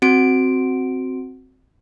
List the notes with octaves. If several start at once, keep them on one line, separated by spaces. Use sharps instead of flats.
C4 F#4 D7